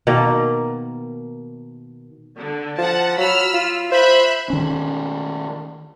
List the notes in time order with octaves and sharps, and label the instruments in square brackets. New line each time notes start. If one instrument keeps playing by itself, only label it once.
[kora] B2 D#3 A#3
[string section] D3
[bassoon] F3 [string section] F#5 A5
[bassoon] F#3 [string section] B5 E6 F6
[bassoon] F4
[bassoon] C5 [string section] E5 B5 F#6
[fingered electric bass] D#3 C#4